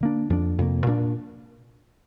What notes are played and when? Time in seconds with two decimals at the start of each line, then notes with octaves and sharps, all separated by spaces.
0.01 D3 A#3 D4
0.30 F2 F3 D4
0.58 F2 C3 A#3
0.86 A#2 A#3 D4